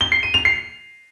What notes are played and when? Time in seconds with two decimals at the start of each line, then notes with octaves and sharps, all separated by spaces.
0.01 G7
0.12 C7
0.23 D#7
0.34 F7
0.45 C7